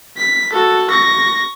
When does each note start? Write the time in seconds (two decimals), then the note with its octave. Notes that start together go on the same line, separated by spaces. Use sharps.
0.17 B6
0.53 F#4 A4
0.90 C#6 A#6